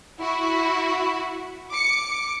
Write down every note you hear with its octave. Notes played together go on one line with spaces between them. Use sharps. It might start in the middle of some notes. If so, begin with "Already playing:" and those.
E4 F#4
D6 C#7